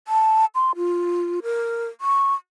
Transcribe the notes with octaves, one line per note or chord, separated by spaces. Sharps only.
A5
C6
F4
A#4
C#6